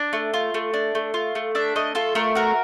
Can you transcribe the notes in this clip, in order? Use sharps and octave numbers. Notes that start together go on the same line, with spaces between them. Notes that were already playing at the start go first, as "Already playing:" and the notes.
Already playing: D4
A3
F4
A3
D4
A3
F4
A3
D4 E5
A3 D#5
F4 A4
A3 A#4
F#4 A#4